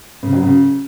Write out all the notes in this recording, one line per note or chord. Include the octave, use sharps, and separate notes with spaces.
C#3
F#3
C#3